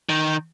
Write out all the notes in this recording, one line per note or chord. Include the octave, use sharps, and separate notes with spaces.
D#3